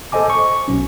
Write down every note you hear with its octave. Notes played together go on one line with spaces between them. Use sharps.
A4 C5 D#5 G#5 D6
C#6
B1 C#4